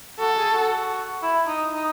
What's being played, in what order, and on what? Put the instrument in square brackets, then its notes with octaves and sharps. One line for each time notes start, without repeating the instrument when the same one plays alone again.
[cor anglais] F#4 [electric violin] A4
[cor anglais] G#4
F#4
E4
D#4
D#4